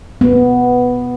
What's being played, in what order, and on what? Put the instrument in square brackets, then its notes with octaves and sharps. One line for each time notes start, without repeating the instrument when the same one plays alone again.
[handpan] B3